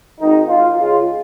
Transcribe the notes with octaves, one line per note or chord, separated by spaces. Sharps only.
G#1 G#2 D#3 D#4
F4
C#2 C#3 G#3 F4